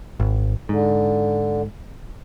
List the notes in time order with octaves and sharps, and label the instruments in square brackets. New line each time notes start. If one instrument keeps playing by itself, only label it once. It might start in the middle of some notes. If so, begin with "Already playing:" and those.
[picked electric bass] G#1
[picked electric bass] G#2 [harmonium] D3